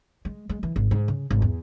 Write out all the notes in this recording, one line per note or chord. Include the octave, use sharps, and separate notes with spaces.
G#3
G#3
E3
G#1
G#2
C#3
G#1
E2